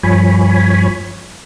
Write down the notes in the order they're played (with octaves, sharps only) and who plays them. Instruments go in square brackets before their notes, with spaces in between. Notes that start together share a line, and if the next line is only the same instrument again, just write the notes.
[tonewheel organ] G2 F3 C#5 G#5 B5